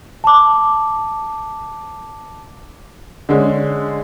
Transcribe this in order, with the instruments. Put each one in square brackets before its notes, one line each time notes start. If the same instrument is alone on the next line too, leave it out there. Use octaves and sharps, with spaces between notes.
[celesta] A5 D6
[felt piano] D3 G#3 C#4